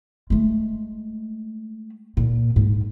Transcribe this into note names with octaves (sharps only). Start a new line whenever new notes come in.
G#3 A3
A#2
G#2